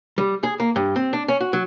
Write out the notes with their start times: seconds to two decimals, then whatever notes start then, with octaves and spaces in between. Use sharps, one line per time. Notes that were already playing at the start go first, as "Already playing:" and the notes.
0.18 G3
0.43 G#4
0.60 A#3
0.76 G2
0.96 C4
1.13 D4
1.28 C#4
1.41 F#4
1.53 F#3